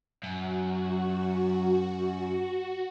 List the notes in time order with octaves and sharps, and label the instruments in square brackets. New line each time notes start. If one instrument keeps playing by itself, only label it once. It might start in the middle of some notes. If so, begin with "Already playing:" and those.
[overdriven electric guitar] F#2 [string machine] F#4